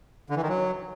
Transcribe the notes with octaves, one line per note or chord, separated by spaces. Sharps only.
D3
E3
D#3
F#3